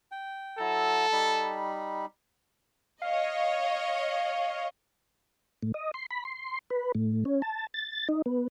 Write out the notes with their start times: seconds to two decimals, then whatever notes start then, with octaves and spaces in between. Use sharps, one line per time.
0.11 G5
0.59 F#3 E4 A4 A#5
1.12 G3 D#4 B5
3.02 C#5 D#5 F5
5.63 A2
5.74 D#5
5.94 C6
6.11 B5
6.25 C6
6.70 B4
6.95 A2
7.25 C#4
7.42 A5
7.74 A6
8.09 D#4
8.26 B3